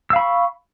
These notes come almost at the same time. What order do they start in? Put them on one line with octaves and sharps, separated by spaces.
E6 F5 B5 C#6